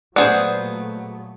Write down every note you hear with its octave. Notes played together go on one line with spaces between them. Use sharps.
A#2 F#3 A3 B3 G#4 C5 D5 F#5